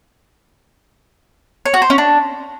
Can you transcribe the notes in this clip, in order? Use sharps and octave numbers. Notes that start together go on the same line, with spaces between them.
C#5
F#4
C5
C#4
D4